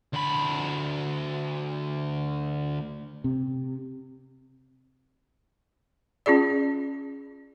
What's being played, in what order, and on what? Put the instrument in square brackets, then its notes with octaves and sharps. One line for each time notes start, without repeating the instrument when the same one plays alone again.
[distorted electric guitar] D2 B5
[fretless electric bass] C3
[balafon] C#4 F4 G#4 D5